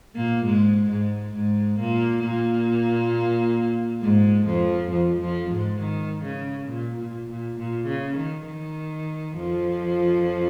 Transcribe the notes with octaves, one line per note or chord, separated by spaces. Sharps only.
A#2 A#3
G#2 G#3
G#2 G#3
G#2 G#3
A#2 A#3
A#2 A#3
G#2 G#3
F2 F3
F2 F3
F2 F3
G#2 G#3
D#3
C#3
A#2
A#2
A#2
A#2
C#3
D#3
D#3
F2 F3